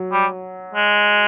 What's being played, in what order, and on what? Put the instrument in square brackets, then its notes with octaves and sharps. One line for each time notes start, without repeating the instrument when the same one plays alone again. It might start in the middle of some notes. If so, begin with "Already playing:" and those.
Already playing: [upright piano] F#3
[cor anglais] G3
G#3